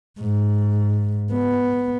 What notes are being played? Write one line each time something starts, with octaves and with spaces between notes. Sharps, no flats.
G#2
B3